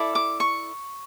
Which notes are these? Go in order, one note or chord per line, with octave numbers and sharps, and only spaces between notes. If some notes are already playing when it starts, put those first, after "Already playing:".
Already playing: E4 A4 D5
D6
C#6